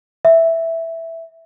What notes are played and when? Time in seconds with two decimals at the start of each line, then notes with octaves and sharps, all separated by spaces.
0.25 E5